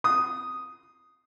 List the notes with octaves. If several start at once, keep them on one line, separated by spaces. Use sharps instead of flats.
D#6